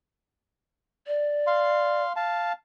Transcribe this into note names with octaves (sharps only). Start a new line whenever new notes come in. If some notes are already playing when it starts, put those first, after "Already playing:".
D5
F5 C6
F5 A5